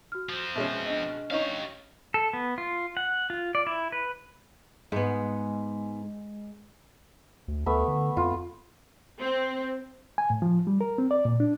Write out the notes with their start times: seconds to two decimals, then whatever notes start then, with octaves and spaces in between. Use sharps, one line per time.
0.12 F#4 F6
0.29 F3 C4
0.56 B2 G#3 C#4 E5
0.86 D4 D#5
1.31 C#4 D#4 G4 C#5 F5
2.14 A4
2.33 B3
2.58 F4
2.97 F#5
3.30 F4
3.55 D5
3.67 E4
3.92 B4
4.92 G#2 G#3 B3
7.48 D2
7.66 D2 A3 B3 E5
7.88 D3
8.17 F2 F4
9.20 C4 C5
10.18 G#5
10.30 A2
10.42 F3
10.67 G3
10.81 A#4
10.98 C4
11.11 D5
11.25 A#2
11.40 D4